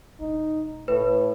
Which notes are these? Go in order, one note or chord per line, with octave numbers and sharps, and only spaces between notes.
E1 D#4
A2 B4